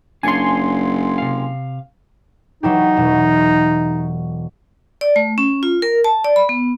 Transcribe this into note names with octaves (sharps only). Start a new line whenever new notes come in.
F#1 D4 C#5 F5 G#5 C6
C3 F5
F#3 D#4 E4 G4
E1 E4
D5
A3
C#4
F4
A#4
A5
D5
B5
B3